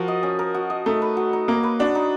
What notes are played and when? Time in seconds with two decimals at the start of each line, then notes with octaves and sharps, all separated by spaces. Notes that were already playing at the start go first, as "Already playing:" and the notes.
Already playing: F3 F#4 A#4
0.08 D#5
0.23 C#4
0.39 A#4
0.54 F#4
0.70 D#5
0.86 A3 D#4
1.02 B4
1.17 F#4
1.33 D#4
1.48 A#3 D#4
1.63 B4
1.79 D4 F#4
1.95 D#4